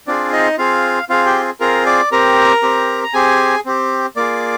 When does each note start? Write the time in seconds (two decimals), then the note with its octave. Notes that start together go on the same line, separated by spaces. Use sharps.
0.07 C4 D4 F4 G#4 D5
0.32 D#4 D#5
0.58 C4 F4 G#4 F5
1.09 C4 F4 G#4 F5
1.26 G4 G5
1.60 C4 F4 G#4 A#4 A#5
1.86 D5 D6
2.12 C4 G4 A#4 A#5
2.63 C4 G4
3.03 A#5
3.13 C4 G4 G#4 G#5
3.66 C4 G4
4.16 A#3 F4 G#4 D5 D6